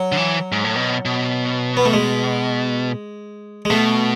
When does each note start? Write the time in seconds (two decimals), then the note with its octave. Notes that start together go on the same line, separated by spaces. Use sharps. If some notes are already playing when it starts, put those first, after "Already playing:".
Already playing: F#3
0.12 D3
0.17 E3
0.52 G#2
0.64 A2
0.76 B2
1.05 B2
1.77 B3
1.85 A3
1.93 G#3
3.65 G#3
3.70 B2 A3